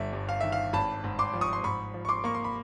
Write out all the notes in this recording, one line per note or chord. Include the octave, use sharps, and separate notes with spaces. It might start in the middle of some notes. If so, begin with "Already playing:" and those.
Already playing: G1 D3 E5
G2
F5
D#3 E5
F5
G#1 A5 B5
G#2
C6 D6
F3
C#6 D#6
C6
G#2 B5 C#6
F3
C#6
C6 D6
A#3 C#6
C6
B5